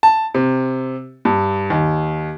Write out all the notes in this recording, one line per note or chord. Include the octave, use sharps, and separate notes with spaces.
A5
C3
G2
D#2